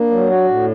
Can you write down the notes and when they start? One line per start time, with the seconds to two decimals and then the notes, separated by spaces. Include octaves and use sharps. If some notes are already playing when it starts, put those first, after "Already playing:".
Already playing: A#3 D4
0.11 F#3
0.30 F#4
0.48 A2